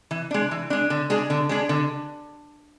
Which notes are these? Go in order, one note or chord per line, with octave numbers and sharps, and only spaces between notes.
E3
G#3 D4
E3
G#3 D4
D3
G#3 D4 G#4
D3
G#3 D4 G#4
D3